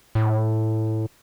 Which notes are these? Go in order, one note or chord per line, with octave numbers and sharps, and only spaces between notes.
A2